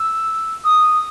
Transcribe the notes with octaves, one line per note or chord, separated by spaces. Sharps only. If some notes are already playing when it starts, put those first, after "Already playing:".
Already playing: E6
D#6